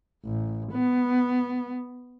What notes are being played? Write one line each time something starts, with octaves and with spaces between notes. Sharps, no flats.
A1
B3